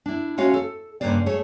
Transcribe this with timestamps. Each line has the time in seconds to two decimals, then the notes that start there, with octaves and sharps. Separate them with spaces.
0.06 D4 E4
0.38 G#3 A3 C#4 F#4 C#5 F5
0.54 A4
1.01 G2 C#3 A#3 B4 C5 D5
1.26 A3 G#4 C#5